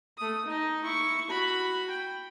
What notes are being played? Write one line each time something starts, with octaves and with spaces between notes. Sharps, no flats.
A3 D#6
D#4 D#5
E4 C#6
F#4 B5
G5